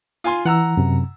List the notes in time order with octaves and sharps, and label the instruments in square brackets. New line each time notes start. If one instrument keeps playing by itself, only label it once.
[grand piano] F4 G#5 C6
[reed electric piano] E3 [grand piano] F#5 A#5 E6
[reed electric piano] F#2 C3